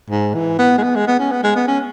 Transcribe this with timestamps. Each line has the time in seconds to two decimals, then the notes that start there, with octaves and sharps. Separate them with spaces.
0.10 G#2
0.34 E3
0.59 B3
0.78 G#3
0.83 B3
0.96 G#3
1.07 B3
1.19 C#4
1.32 B3
1.43 G#3
1.56 B3
1.68 C#4